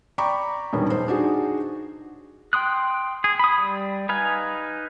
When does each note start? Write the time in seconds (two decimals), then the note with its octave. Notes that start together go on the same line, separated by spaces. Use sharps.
0.18 D5 G5 A#5 B5 C#6 D6
0.73 E1 G2 D#3 C#4
0.90 B1 C5
1.08 D4 D#4 F#4 G#4
2.53 G5 C6 D#6 F#6
3.24 G#4
3.39 B5 D#6
3.58 G3
4.09 D#4 B4 F5 G#5